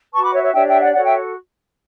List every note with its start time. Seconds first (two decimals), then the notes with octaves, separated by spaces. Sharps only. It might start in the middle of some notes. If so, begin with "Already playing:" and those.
0.12 F#4 B4 A5 C#6
0.23 B5 D6
0.32 C#5 E5
0.42 C#5 E5
0.53 D4 G4 C#5 E5 G5
0.67 E5 G5
0.80 D5 F#5
0.94 F#4 A4 C#5 D5 F#5
1.03 E5 G5